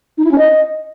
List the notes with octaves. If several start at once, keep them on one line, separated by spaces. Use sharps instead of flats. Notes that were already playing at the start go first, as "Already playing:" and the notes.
D#4
E4
C#4
D#5